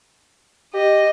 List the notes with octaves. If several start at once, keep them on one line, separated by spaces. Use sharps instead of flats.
G4 D#5